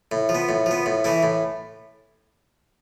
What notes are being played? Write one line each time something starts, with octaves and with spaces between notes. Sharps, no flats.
A2
F3
B3
A2
F3 B3
A2
E3 A3 E4
A2